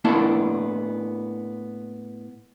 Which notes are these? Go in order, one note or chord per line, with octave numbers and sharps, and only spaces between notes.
A2 A#3 B3 D4 E4 A5